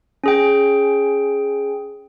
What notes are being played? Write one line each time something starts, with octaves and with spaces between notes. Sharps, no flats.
C#4 G#4 G5